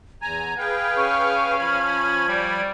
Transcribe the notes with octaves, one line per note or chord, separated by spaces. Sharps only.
E2 G#5 A#5 G#6
G#4 B4 F5 G5
C#4 C#6
F3 B5 G#6
G3 D5